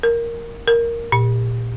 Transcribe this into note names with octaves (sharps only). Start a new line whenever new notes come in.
A#4
A#4
A#2